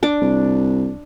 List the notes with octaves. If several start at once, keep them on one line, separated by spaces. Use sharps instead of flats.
D4 D6
C2